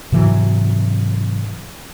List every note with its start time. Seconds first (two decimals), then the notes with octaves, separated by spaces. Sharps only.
0.12 G#2 C3 E3 F#3